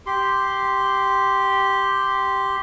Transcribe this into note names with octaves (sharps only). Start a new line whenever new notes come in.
G4 C6